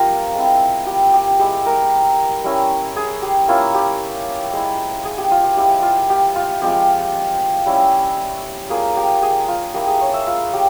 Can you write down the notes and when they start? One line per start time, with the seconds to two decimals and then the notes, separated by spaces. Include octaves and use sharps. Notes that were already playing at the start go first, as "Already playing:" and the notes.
Already playing: F3 C4 F4 G4 A#4
0.35 G#3 C4 E4
0.87 G4
1.14 G4
1.39 G#3 E4 G4
1.66 A#4
2.44 G3 C#4 E4
2.96 G#4
3.22 G4
3.48 A#3 C#4 E4 F4
3.74 G4
4.53 G#3 E4
5.05 G#4
5.18 G4
5.32 F4
5.44 G4
5.57 G#3 E4 G4
5.83 F4
6.10 G4
6.36 F4
6.62 F3 G#3 C4 G4
7.66 G3 C#4 E4
8.70 A#3 F4 G#4
8.97 G4
9.22 G#4
9.48 F4
9.74 A#3 E4 G4
9.87 G#4
10.01 C#5
10.14 E5
10.27 F4
10.53 G4